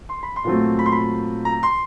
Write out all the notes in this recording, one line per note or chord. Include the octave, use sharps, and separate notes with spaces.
C6
B5
C6
A#2 F#3 A3 C4
B5
C6
B5
A#5
C6